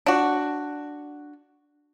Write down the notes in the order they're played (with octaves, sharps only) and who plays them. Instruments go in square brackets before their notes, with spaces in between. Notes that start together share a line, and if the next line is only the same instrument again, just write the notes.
[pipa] D4 F#4